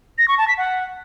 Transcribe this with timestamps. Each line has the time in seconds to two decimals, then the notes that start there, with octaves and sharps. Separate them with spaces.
0.18 A#6
0.28 C#6
0.38 A5
0.48 B6
0.58 F#5